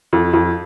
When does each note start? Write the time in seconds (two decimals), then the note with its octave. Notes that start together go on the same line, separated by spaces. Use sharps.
0.13 F2
0.33 F2